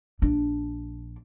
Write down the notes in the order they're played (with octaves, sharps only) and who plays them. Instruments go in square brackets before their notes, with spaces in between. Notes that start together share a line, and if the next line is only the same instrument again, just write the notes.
[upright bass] A#1 D4